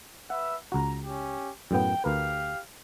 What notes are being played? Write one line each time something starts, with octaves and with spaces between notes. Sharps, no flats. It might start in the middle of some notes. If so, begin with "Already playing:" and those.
B4 E5 F#5
C#2 F#4 A#5
C#4 G4
F#2 A2 B3 G5
D2 G4 A#4 B4 F5